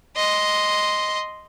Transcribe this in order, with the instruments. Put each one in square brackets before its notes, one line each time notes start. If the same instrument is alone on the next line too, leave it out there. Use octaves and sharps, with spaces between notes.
[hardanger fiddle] D#5 C6